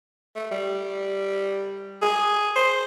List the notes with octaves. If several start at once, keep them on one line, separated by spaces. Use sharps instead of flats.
A3
G3
G#4
C5